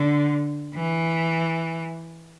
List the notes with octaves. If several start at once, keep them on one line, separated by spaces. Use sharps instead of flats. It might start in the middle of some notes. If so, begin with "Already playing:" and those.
Already playing: D3
E3